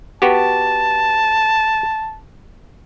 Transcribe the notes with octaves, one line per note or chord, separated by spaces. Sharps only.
B3 F#4 G4 A5